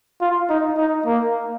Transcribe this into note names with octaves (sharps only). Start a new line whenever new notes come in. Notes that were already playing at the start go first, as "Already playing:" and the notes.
F4
D#4
D#4
A#3